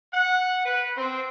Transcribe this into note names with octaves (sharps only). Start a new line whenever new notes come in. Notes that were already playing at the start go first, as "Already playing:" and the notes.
F#5
B4
C4